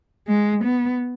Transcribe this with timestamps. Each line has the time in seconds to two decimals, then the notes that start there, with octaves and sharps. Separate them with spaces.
0.28 G#3
0.65 B3